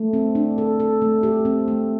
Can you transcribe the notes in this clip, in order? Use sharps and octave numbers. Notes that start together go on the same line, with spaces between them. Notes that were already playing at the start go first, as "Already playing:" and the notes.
Already playing: A3
C4
D4
A4
A4
A3
G4
C4
A3